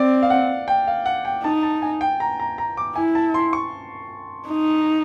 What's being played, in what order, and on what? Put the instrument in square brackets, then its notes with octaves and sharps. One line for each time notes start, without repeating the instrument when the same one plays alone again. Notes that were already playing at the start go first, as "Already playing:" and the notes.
Already playing: [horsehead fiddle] C4 [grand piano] D5
[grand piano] F5
F#5
G5
F5
F#5
G5
[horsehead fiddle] D#4 [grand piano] A5
[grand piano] A5
G#5
G5
A#5
A#5
A#5
D6
[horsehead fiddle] E4 [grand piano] G#5
[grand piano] A5
C6
C#6
[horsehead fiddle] D#4